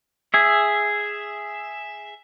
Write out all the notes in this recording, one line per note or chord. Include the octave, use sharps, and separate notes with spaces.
G#4 E5